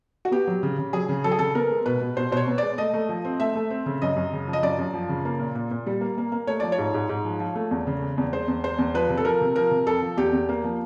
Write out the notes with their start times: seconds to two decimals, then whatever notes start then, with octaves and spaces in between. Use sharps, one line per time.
0.25 F#4
0.31 B3 G4
0.47 F#3
0.63 C#3
0.78 C#3
0.93 F#3 G#4
1.09 C#3
1.24 F#3 A4
1.32 G#4
1.39 C#3 A4
1.55 B3 A#4
1.70 G#3
1.86 B2 B4
2.01 B2
2.17 B2 C5
2.31 B2 C5
2.37 C#5
2.47 B3
2.58 G#3 D5
2.78 A3 D#5
2.94 A3
3.09 F3
3.25 C4
3.40 A3 E5
3.55 A3
3.70 C4
3.86 C#3
4.02 F#2 D#5
4.16 F#2
4.33 C#3
4.48 F3
4.53 D#5
4.63 F#2 D5
4.78 F#2
4.94 F3
5.09 C#3
5.25 A#3
5.40 A#2
5.55 A#2
5.71 A#2
5.87 G3
6.01 A#3
6.18 A#3
6.32 A#3
6.47 A3 C#5
6.60 F3 D5
6.72 C#5
6.78 G#2
6.94 G#2
7.09 G#2
7.25 F3
7.40 F3
7.56 A3
7.71 E2
7.87 C#3
8.02 G#3
8.18 E2
8.33 G#3 C5
8.48 E2
8.64 G#3 C5
8.79 E2
8.94 F3 B4
9.10 C3
9.17 A4
9.25 F3 A#4
9.41 C3
9.56 F3 A#4
9.71 C3
9.86 F2 A4
10.02 F3
10.17 E2 G4
10.33 E2
10.49 A#3
10.64 F3